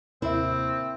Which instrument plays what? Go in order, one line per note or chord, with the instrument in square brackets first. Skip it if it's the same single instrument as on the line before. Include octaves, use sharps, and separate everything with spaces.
[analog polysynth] D#2 A2 C3 [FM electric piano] A#3 E5 [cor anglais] C4 [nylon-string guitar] E4